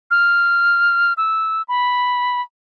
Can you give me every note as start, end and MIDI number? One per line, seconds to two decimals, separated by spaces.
0.11 1.13 89
1.17 1.62 88
1.68 2.41 83